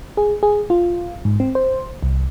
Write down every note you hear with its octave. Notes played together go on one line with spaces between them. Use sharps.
G#4
G#4
F4
G#2
C4
C5
C2